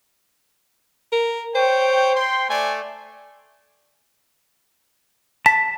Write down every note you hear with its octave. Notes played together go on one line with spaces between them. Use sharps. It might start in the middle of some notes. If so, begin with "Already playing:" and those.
A#4
C5 C#5 G5
G5 C6
A3 D5 G#5
A5 B6